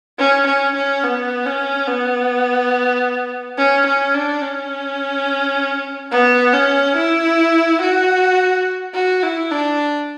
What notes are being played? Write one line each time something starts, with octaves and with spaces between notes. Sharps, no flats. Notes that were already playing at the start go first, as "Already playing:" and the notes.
C#4
C#4
C#4
B3
C#4
B3
C#4
C#4
D4
C#4
B3
C#4
E4
F#4
F#4
E4
D4